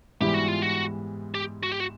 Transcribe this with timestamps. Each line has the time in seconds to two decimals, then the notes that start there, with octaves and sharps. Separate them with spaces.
0.20 G#2 E3 G3 B3 E4 G4
0.34 F#4
0.48 F4
0.62 F#4
1.34 G4
1.63 F#4
1.72 G4
1.80 F#4